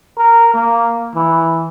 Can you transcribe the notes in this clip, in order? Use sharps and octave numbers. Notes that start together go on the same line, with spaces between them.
A#4
A#3
E3